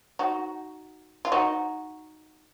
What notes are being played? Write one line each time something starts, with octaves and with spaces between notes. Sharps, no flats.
D#4 F#4
F4
D#4 F#4